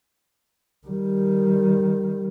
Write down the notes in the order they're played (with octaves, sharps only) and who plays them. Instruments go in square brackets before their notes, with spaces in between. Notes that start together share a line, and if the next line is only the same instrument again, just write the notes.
[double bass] D#3 G3